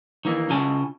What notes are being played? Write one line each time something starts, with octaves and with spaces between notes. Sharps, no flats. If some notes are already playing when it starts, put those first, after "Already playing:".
D#3 E3 A#3
C#3 F4 G#5 A5